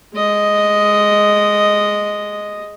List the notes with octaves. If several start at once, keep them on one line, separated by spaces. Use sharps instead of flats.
G#3 D#5